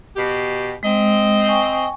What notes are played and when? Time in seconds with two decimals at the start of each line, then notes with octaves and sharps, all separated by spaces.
0.15 B2 G4
0.83 G#3 C4 D#5
1.47 G5 G#5 C#6